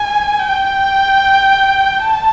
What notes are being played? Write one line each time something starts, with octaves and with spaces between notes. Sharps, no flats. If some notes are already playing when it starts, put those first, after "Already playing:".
Already playing: G#5
G5
A5